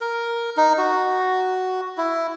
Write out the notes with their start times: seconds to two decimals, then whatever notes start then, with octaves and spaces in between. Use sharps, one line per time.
0.01 A#4
0.57 D#4
0.78 F#4
1.98 E4